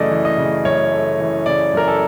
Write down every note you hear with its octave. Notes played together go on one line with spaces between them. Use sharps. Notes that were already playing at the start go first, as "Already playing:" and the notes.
Already playing: F#2 C#3 E3 A3 D5 D#5
E3
D#5
C#3
F#2 C#5
A3
E3
C#3 D5
F#2 A#4
A4